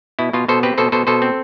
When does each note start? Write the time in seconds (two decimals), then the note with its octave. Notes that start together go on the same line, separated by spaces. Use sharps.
0.19 B2 E4
0.33 B2 F4
0.48 B2 A4 C5
0.63 C4 G4 B4
0.78 B2 A4 C5
0.92 B2 A4 C5
1.07 B2 A4 C5
1.22 C4